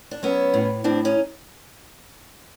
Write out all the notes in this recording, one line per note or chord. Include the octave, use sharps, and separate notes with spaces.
D4
F#3 B3 C#4
A2
A2 C4 D4
C#4 D#4